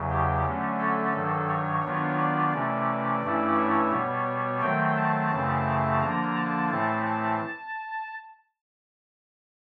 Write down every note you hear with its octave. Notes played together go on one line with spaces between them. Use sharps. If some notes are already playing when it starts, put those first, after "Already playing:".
Already playing: E2 C#3 F#3
G4
D3 F#3 A3 C#4
A4
G2 D#3 F#3
C#5
D#3 F#3 B3 D4 F4
D5
C3 E3 A3 C#4
G2 E3 A3 C#4 E4
C#5
B2 G3 B3
D#3 F#3 A3 C4 G5
A5
F#2 C#3 E3 A3 C4
D3 F3 A#3 D4 A#5
A5
A2 E3 A3 C4 A5
A5